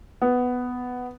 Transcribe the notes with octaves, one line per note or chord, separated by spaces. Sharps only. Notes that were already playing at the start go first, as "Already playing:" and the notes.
B3